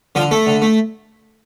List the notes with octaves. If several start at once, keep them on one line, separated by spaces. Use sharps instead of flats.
D3 F3 F4
A3 A4
D3
A3